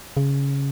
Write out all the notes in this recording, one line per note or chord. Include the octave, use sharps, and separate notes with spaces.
C#3